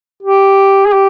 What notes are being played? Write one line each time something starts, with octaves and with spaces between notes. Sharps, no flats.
G4
G#4
G4